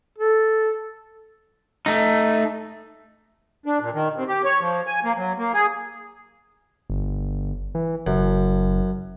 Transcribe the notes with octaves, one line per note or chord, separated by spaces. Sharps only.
A4
A3 D#4
D4
A#2
D#3
C3
G4
C#5
F3
G#5
A#3
F#3
A#3
G#4
G1
E3
F#1 F#2